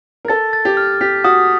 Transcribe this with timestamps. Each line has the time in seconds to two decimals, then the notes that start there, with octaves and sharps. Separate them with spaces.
0.25 A#4
0.28 A4 A6
0.53 A6
0.65 G4
0.77 F6
1.01 G4 B6
1.24 F#4 D#6